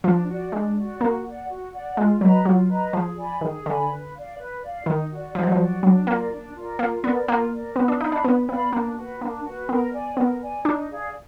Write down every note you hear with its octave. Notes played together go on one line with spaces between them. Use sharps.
F3 D4
F#4 D5
G#3 D4
F#4 D5
A#3 F#4
D5 F#5
F#4
D5 F#5
G#3 F4
F#3 B4 D#5 A#5
F#3 F4
B4 D#5 A#5
F3 G#4
D5 G#5 B5
D#3 G#4
D3 D5 G#5 B5
B4
D5 F5
B4
D5 F5
D#3 D#4
F#4 D5
F3 D#4
F#3
F3
F#4 D5
F#3 D4
A#3 F4 A#4 D5
D4
F4 A#4 D5
A#3 F4
B3 A#4 D5
A#3 F4
A#4 D5
B3 B4
D4
D#4 D5 F5 B5
D4
B3 B4
B3 D5 F5 B5
A#3 D4
F#4 B4
A#3 D4
F#4 B4
B3 A#4
D5 G#5
B3 A#4
D5 G#5
D4 D#4
G#4 D5 F5